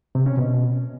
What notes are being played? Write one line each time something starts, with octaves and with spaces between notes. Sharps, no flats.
C3
C#4
B2